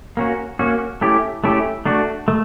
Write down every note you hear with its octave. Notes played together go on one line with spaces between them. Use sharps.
A#3 C#4 F#4
A#3 C#4 F#4
A3 C#4 E4 G4
A3 C#4 E4 G4
A3 D4 F#4
A3